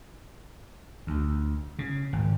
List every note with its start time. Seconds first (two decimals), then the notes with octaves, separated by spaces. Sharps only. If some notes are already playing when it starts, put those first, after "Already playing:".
1.07 D2
1.79 C#3
2.13 G#1